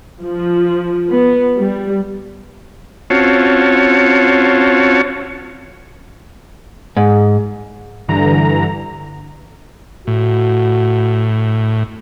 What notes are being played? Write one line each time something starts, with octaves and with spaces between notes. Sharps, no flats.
F3
B3
G3
C4 C#4 F4 F#4 C#5 A5
G#2
G2 D3 E3 A#5
A2 F#4